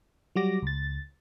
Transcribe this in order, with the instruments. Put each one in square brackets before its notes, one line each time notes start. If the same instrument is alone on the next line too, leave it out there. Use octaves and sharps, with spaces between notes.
[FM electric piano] F#3 G3 F#4 D6 A#6
C#2 A6